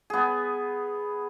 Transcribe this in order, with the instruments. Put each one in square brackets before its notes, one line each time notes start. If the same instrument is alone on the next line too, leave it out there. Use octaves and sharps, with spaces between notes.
[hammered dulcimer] B3 G#4